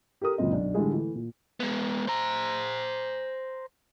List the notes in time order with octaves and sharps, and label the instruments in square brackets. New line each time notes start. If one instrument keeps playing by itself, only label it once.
[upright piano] G4 A4 A#4 D#6
C#2 F#2 A#2 C4 D#5
B1 D4
A2 D3 E3 G3 G#3 G#4
E3 A3
A#2
[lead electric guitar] G#3 B3
C5 A#5